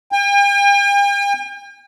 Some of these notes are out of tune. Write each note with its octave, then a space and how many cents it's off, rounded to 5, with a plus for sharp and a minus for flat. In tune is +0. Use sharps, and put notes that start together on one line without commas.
G5 +45